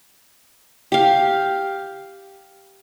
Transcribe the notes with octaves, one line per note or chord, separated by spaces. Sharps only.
G4 F5